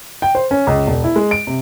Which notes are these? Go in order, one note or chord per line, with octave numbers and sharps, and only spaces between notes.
G5
C5
C#4
C#2
E1
E4
G#3
D7
C3